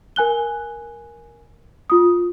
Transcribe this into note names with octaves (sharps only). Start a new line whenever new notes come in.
A#4 G#5 F#6 G7
F4 D#6